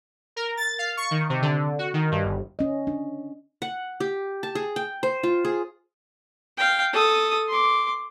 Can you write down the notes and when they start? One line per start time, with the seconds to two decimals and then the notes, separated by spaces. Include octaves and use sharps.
0.36 A#4
0.57 A6
0.79 F5
0.97 C#6
1.11 D#3
1.30 C3
1.42 D3
1.79 F#4
1.94 D#3
2.12 G2
2.24 G1
2.59 C#4 D#5
2.87 D4
3.62 F#5
4.00 G4
4.43 A5
4.55 G#4
4.76 G5
5.03 C5
5.23 F4
5.45 G#4
6.57 F5 G5
6.93 A4 D#6
7.49 C6 D6